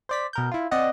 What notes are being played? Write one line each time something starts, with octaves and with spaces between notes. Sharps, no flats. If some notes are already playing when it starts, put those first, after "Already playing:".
C5 D5 B6
B2 A#4 G6
E4 F4
C4 D5 D#5 F#5